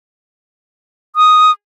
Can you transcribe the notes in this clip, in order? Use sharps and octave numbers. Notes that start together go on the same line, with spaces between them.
D#6